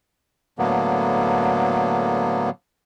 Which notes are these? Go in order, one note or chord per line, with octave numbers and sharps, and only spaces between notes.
A2 D3 F#3 A#3 B3